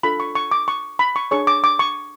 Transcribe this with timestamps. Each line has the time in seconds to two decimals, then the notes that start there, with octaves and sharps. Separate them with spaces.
0.03 D4 F4 A4 B5
0.20 C#6
0.35 C#6
0.51 D6
0.68 C#6
0.99 B5
1.16 C#6
1.31 D4 G#4 C#5 C#6
1.47 D6
1.64 D6
1.79 C#6